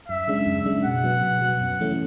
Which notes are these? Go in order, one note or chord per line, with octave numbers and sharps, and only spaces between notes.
F#2 E5
C#3 G#3 D4
F#2
C#3 G#3 D4
B2 F#5
F#3 B3
B2
F#3 B3
F#2
C#3 E3 A3 C#4